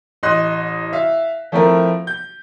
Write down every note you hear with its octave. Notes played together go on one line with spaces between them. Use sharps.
A1 D#5 C6 F#6
E5 F5
F3 A3 C4 E4 F4 A#4
G6